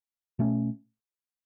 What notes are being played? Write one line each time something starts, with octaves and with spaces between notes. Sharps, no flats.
B2 A3 C#4